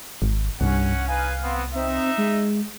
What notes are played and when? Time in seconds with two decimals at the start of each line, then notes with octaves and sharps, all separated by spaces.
0.22 G#1
0.61 C2 G2 C#4 F#5
1.08 D#4 B4 F5 G#5
1.43 B3 C4
1.74 C4 D#4 E5
2.18 G#3